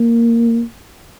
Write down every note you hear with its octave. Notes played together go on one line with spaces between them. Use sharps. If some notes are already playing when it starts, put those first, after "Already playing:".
Already playing: A#3